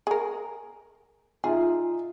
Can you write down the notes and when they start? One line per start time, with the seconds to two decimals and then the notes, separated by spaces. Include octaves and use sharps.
0.07 G#4 A#4
1.44 D#4 F4 G#4 E5